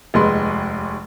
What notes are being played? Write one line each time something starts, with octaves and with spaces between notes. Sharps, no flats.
F1 D#2 G#3 B4 C6